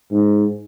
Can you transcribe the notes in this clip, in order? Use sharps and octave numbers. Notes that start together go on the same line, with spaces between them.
G#2